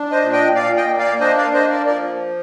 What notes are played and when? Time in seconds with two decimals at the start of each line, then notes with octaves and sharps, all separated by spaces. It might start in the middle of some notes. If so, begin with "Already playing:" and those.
Already playing: D4
0.11 C5 D#5
0.22 A#2
0.33 D#5 G5
0.55 A#2 D5 F5
0.77 D#5 G5
0.87 A#3
0.98 D5 F5
1.21 D4 C5 D#5
1.38 D5 F5
1.53 A#3 C5 D#5
1.70 A#4 D5
1.86 F3 A#4 D5